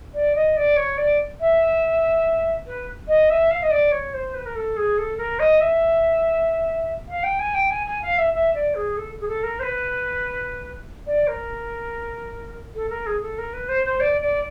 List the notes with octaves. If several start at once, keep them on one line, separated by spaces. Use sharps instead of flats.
D5
D#5
D5
C#5
D5
E5
B4
D#5
E5
F5
D#5
D5
C#5
C5
B4
A#4
A4
G#4
A4
A#4
D#5
E5
F5
G5
G#5
G5
G#5
G#5
F5
E5
E5
D5
G#4
A4
G#4
A4
A#4
C5
B4
D5
A#4
A4
A#4
G#4
A4
A#4
B4
C5
C5
D5
D5